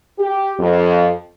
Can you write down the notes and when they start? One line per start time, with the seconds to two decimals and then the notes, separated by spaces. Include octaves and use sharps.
0.19 G4
0.60 F2